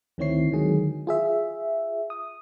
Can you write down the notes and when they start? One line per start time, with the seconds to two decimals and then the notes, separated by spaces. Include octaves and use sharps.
0.18 D2 D#3 C4 E4 C#5 C7
0.52 D3 D#3 F#3 G#3 G#4
1.07 F4 G#4 E5
2.10 D#6